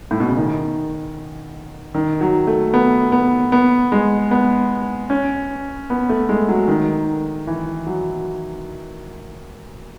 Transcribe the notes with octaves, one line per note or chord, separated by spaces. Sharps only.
A2
B2
C#3
D#3
D#3
F#3
A3
B3
B3
B3
G#3
B3
C#4
B3
A3
G#3
F#3
D#3
E3
F#3